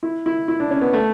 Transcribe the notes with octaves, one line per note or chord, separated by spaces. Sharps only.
E4
E4
E4
D4
C#4
B3
A3